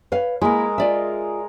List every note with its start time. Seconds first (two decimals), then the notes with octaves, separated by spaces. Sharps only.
0.12 B4 C#5 F5
0.41 G#3 A#3 E4 A#4
0.78 F4 D5 E5